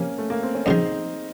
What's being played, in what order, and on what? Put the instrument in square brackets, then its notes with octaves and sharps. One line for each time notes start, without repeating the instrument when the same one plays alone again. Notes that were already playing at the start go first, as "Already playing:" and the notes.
Already playing: [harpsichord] C3 F3 [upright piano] A#3 C#4
[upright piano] A3
A#3
C4
C#4
[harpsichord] F#2 C#3 F3 [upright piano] C4 D#4